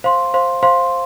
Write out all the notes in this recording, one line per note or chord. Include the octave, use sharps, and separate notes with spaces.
C5 F5 C6
C5 F5 C6
C5 F5 C6